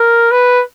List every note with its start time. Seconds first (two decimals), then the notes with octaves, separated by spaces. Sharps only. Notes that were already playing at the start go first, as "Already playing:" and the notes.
Already playing: A#4
0.31 B4